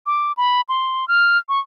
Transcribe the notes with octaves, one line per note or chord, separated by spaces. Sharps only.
D6
B5
C6
F6
C#6